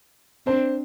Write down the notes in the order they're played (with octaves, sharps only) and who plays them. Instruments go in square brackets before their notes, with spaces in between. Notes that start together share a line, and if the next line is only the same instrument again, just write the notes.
[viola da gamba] C4 D4 [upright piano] C5